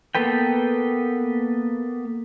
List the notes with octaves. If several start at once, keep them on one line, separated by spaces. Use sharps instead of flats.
A#3 B3 A4 B4 G5